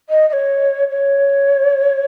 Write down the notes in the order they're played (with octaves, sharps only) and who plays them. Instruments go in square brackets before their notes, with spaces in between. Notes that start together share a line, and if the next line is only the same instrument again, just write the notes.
[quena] D#5
D#5
C#5
C#5